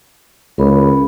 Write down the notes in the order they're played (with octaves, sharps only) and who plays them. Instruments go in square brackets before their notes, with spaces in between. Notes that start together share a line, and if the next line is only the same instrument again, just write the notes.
[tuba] C#2 [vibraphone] C#4 A#4 B5